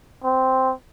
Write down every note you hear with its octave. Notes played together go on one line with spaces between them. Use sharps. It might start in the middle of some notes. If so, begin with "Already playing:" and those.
C4